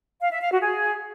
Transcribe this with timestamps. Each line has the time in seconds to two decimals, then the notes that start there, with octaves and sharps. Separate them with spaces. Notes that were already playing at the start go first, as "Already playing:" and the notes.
0.21 F5
0.31 E5
0.41 F5
0.51 F#4
0.62 G#4